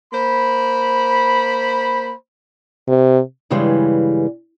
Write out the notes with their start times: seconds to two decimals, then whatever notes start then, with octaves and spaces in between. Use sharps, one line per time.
0.13 A#3 C5 B5
2.88 C3
3.50 G2 C#3 E3 G3 G#3